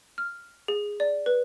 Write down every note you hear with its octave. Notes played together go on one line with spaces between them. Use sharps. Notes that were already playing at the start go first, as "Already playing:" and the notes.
F6
G#4
D5
B4